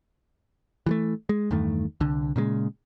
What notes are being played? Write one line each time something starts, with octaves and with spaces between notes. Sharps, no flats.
E3 G3 A3
G#3
E2 G2 D#3 A3
C2 D3
A#2 C#3 F3 G#3